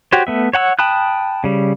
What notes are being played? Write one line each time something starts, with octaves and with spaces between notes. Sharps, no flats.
F#4 G4 C5 C#5
A3 B3 E5
C#5 F#5 A5 E6
G5 A5 B5 D#6 F#6
C#3 G3